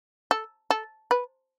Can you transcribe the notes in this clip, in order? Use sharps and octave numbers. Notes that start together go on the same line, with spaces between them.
A4
A4
B4